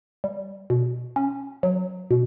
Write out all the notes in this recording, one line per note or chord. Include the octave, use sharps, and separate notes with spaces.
G3
B2
C#4
F#3
B2